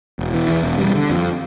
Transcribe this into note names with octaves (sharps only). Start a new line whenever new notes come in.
E1
E3
E2
E1
G3
D3
F2